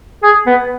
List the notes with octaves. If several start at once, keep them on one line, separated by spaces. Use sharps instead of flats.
G#4
B3